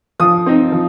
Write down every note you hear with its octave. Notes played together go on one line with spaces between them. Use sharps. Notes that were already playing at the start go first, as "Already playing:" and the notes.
F3 D#6
C4 D#4
F3